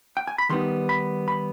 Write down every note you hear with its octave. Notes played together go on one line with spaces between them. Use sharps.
G5
G#5
B5
D#3 G3 B3 D#4 C6
B5
B5